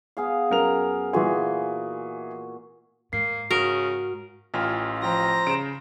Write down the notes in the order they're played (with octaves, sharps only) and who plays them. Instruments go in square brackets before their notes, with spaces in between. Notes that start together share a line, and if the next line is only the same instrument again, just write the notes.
[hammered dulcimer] B3 G#4 F5
[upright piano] F#2 A#4 F7
[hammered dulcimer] A#2 F#4 C6 [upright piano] E3 G#4
[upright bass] G#2 [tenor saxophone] A#3 [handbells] C7
[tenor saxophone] C#3 [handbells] F#4 [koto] A#4
[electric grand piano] A1 F4 [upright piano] G5 G#5 F6
[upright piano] F3 G5 [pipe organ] C5 A#5 A#6
[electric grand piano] C#3 [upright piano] D7 E7